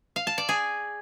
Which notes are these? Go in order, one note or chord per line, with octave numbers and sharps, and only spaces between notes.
F5
A5
D5
G#4